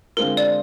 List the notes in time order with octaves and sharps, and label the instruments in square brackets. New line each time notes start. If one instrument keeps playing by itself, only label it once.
[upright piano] D3 G#3 C4 F4 [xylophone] A#4
[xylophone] D5